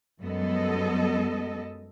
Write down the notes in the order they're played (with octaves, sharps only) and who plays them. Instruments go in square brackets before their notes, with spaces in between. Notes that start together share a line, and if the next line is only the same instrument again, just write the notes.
[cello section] F#2 G3 G#3 B3 A4 D#5